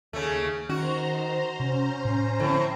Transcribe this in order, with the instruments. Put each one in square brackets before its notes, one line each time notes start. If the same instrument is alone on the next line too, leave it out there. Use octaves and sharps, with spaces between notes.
[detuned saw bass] D#2 [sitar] C#3 A3
[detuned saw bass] D#3 [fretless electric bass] C#4 [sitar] F#4 [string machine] C5 A#5
[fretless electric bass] C3 [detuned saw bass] C#4
[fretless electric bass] A2
[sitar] A2 [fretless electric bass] D3 F3 C4